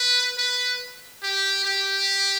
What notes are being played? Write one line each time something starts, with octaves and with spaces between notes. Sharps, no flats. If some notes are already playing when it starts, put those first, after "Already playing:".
Already playing: B4
B4
G4
G4